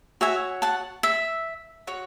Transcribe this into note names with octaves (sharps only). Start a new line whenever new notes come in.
F#4 C#5 E5 G#5
F#5 A5
E5
F#4 C#5